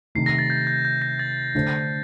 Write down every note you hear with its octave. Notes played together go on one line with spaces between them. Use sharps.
C3 D#3 A3 C7
A#6
A6
G6
G6
G6
A#6
A6
D3 A3 D4 A4 C5